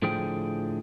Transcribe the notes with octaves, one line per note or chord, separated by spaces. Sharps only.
A2 D3 F3 G#4 C5 G5